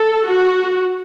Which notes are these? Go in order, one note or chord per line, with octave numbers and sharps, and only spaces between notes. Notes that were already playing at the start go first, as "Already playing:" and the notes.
Already playing: A4
F#4